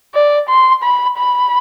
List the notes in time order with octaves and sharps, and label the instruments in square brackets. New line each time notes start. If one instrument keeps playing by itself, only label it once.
[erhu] D5
C6
B5
B5